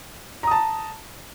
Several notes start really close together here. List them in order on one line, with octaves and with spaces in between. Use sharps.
A#5 D#6 A5